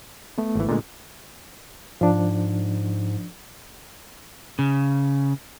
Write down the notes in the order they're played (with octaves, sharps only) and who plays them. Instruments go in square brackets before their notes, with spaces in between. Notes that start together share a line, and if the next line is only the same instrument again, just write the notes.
[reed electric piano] A3 B3
[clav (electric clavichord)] G#1 E3
A#2 D3 G#3
[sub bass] G#2 [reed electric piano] F3 D4
[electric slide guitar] C#3